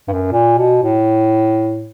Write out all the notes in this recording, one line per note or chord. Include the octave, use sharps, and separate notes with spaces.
G2
F#2
A#2
B2
A2